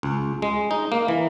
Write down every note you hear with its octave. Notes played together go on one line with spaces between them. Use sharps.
C#2
G#3
D#4
A#3
E3